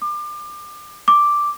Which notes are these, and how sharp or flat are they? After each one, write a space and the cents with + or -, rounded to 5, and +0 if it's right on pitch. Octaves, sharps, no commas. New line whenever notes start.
D6 +30
D6 +0